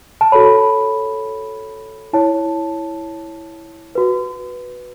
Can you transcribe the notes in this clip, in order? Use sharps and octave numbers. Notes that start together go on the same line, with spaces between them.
A5
F#4 A4 C#5 B5
E4 C#5 A5
F#4 B4